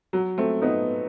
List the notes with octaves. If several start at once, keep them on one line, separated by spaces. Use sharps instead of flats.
F#3
A3 C4
B3 D#4